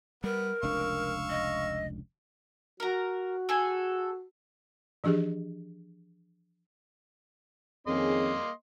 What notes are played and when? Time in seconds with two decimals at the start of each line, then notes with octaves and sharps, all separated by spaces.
0.24 G3 B3 A#4
0.63 F1 C#2 D4 F5 C#6 E6
1.30 D#5
2.80 F#4 A#4 A#5
3.49 G#4 A4 G#5
5.04 E3 F3 D4 G4 G#4
7.87 F2 D#3 A#3 C#4 G#4 D#5 C6